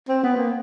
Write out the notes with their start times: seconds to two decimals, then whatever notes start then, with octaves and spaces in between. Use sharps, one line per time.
0.08 C4
0.23 B3
0.37 A#3